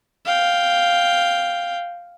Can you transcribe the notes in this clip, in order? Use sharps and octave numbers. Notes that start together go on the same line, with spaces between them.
F5 G5